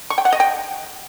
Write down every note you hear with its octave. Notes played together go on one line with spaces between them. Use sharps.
C#6
G5
F#5
D#5
G5